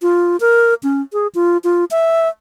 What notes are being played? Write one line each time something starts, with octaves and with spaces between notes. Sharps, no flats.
F4
A#4
C#4
G#4
F4
F4
E5